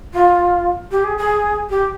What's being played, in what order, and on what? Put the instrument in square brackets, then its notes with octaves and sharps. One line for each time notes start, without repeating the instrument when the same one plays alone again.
[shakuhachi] F4
G4
G#4
G#4
G4